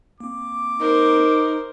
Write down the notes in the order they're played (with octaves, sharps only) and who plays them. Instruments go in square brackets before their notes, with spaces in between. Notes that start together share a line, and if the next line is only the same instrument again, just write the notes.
[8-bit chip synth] A#3 C4 [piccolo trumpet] D6
[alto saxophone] D#4 [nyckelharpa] A#4 C5